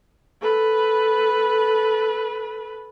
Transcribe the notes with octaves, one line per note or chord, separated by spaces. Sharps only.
A4 B4